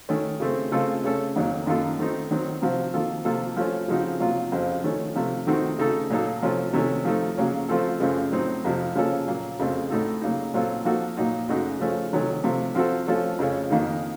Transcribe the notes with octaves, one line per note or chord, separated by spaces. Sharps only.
D#3 A3 C#4
C#3 A3 C4
C#3 A3 C4 F4 A4
C#3 A3 C#4 A4
F2 D#3 F#3 A#3
F#2 D#3 A#3 F4 A4
D#3 A3 C4 D#4
D#3 F#3 C4
C3 F3 C4 F#4
D#3 A#3 F4 A4
C3 F3 A#3 F4 A4
F3 A3 C#4 F4
C#3 F3 C4 D#4 F#4
C3 F#3 A#3 F4
F2 C#3 F3 C4
D#3 A3 C#4
C3 F3 A3
D#3 A3 C4 D#4 F#4
C#3 A3 D#4 A4
A#2 F#3 A#3 D#4 A4
C3 F3 A3 C#4 F4
C3 D#3 A3 C#4
F3 A3 D#4
C#3 F#3 A#3 C#4
F3 A3 C4 F4 A4
F#2 C#3 F3 A3 C4
A2 F#3 C4 D#4
F2 C3 F3
C#3 F3 A#3 C#4 A4
A#2 F#3 A#3
F2 C#3 A3 C4
A2 A3 D#4 F#4 A4
C#3 F#3 A#3 D#4
A#2 F#3 C4 F4 A4
F3 A#3 D#4 F#4 A4
A#2 F#3 A#3 D#4 F#4
F#2 C#3 A3 D#4 F#4
C#3 F3 A3 C#4
C3 D#3 F#3 A3 C#4
C3 F3 A3
F3 C4 F#4 A4
F3 A3 C#4 F4 A4
F2 C#3 A3 C#4
F2 D#3 A#3 D#4